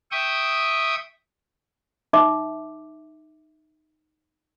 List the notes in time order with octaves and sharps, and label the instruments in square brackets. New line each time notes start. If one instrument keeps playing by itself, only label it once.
[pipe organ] E5 G5 C#6 D#6
[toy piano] D#4 E5 D6